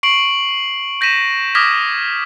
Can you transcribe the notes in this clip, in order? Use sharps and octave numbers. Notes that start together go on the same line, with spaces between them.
C#6 C7 D7 F#7
G6 A#6 B6 D#7 E7
D6 D#6 F6 G#6 A#6 B6